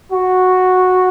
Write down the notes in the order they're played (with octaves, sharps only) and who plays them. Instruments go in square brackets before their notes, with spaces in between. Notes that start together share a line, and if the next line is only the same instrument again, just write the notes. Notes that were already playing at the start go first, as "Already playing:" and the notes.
[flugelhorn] F#4